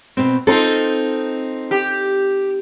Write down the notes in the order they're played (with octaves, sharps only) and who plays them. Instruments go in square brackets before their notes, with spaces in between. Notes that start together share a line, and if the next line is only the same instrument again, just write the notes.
[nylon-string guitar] B2 C4
[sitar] C4 D#4 [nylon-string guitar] F4 A4
[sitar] G4